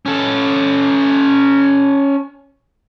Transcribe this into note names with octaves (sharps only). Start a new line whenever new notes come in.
C#4 A4